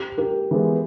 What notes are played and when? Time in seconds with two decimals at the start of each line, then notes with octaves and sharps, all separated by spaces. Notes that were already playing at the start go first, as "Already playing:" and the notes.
Already playing: G4
0.18 G4 A#4
0.51 E3 G#3 B3